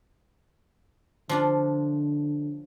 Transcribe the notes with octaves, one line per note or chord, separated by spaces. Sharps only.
D3 F3 D4 F4